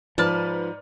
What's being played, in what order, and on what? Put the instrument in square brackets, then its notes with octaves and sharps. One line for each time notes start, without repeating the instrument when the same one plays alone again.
[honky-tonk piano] G#2 B4 F6 [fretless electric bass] F3 [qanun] D5 A5